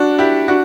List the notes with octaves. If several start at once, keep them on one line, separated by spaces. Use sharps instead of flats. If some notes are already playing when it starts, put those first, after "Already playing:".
Already playing: D4 F#4
E4 G4
D4 F#4